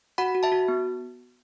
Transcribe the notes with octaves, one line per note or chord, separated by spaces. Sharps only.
F#4 F#5 B5
F#4
E5 A5
F#4
B3